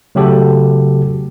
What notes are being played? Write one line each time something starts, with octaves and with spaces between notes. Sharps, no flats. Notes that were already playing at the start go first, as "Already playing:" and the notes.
C#3 F#3 A3 F#4 G4 A4